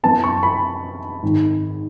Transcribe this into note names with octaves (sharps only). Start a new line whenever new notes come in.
F#2 E3 B3 A5
C#6
B5
G#1 G#2 D#3